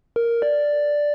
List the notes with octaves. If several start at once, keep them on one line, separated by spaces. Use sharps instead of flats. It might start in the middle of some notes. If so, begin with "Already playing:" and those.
A#4
D5